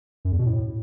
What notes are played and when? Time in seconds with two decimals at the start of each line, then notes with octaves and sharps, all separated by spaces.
0.25 F#2
0.32 E2
0.39 B2
0.46 A2